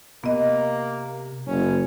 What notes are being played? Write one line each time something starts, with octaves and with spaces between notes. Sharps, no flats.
C3 A#3 B3 D#5
F#1 C#4